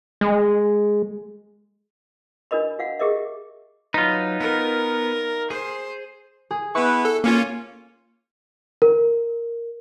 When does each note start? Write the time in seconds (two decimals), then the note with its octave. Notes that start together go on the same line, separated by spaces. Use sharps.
0.21 G#3
2.51 D4 F#4 A#4 D#5 B5
2.79 F#4 F5 F#5
2.99 G4 G#4 A#4 D#5 E5
3.94 F#3 D#4 F4 B4
4.40 B3 A#4 B4
5.50 G#4 C5
6.51 G#4
6.75 B3 E4 B4 C#6
7.05 A4
7.24 A#3 C#4 F4
8.82 A#4